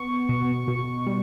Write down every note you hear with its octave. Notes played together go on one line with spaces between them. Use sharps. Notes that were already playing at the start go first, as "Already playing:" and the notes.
Already playing: B3 C#6
B2
B2
G3